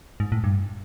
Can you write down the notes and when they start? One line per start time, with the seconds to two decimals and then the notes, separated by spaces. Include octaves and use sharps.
0.20 G#2
0.32 A2
0.44 G2